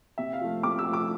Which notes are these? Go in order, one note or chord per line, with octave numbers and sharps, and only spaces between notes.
C3 E5
F5
F3 A3
C3 D6
E6
F3 A3
D6